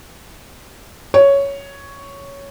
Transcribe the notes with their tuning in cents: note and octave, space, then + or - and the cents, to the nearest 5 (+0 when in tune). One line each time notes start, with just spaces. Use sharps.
C#5 +5